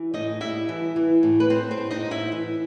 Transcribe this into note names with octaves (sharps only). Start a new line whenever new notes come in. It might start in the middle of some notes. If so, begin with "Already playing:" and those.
Already playing: E3
A2 D#4 D#5
G3 E4 E5
E3
E3
A2
B4
A2 C4 C5
C4 C5
G3
D#4 D#5
A2
E4 E5
E3